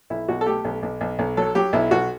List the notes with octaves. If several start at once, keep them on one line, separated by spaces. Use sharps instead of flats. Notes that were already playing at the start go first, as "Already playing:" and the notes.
B1 E4
B1 F#4
A4
A3 G4
B1
B1
B1
B1
F#3 A4
F#3 G4
B1 E4
B1 F#4